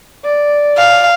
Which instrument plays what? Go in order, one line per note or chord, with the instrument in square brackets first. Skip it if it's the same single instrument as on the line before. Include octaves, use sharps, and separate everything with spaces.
[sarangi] D5
[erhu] F5